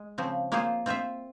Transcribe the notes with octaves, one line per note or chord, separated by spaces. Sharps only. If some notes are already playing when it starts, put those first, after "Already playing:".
Already playing: G#3
C#3 F3 C4
A#3 F4 G#4 C5
C4 F4 C5 E5